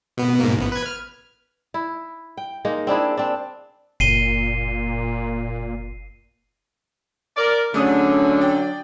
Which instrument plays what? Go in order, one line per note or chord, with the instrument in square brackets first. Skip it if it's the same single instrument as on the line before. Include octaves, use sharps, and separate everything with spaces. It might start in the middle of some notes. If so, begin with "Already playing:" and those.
[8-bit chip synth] B2 B3
G#2 B2 A#3
A1 B3
B4 G#6
F6
[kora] E4
G5
G#3 A#3 D#4
C4 D4 E4 G#4
C4 D4
[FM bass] F#1 [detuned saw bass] A#2 [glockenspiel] C7 D#7 G7
[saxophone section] A#4 [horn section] D5
[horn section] D3 [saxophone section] F#3 D4 [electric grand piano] A3 G#4 D#6 [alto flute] C#4
[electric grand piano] D5 G5